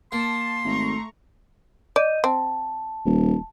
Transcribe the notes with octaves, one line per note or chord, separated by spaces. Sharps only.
A#3 A5 C6
G#1 A3 A#5 C#6
D5 D#5 G6 D#7
C4 A5
D#1